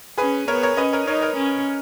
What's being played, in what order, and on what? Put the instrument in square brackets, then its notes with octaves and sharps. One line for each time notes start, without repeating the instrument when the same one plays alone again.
[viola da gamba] C#4 [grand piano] G#4 B4
[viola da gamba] B3 [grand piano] A#4 C#5
[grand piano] A#4 C#5
[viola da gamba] C#4 [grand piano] B4 D#5
[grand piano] A#4 C#5
[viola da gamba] D#4 [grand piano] A#4 C#5
[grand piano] A#4 C#5
[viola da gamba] C#4